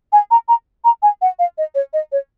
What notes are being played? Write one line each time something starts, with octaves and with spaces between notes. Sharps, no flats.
G#5
A#5
A#5
A#5
G#5
F#5
F5
D#5
C#5
D#5
C#5